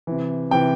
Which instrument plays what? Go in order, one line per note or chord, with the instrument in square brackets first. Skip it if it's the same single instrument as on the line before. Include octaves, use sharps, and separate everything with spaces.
[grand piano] C3 E3
C3 E3 G5